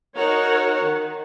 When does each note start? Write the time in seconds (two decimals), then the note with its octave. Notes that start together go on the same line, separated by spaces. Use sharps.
0.16 D#4 F#4 A#4 C#5 F#5
0.81 D#3